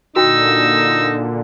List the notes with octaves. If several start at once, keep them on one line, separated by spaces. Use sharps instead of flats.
A#2 D3 D#4 F#4 G5 E6